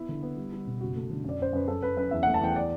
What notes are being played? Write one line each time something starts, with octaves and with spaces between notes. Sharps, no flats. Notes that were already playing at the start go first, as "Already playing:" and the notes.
Already playing: B3 E4
D3
B3
G3
G3
B2
F#1 F#4
A3
D3
F#2 D5
F#2 C5
F#2 B4
F#2 A4
F#2 B4
F#2 B4
E2 E5
A3 F#5
A5
E2 G5
D5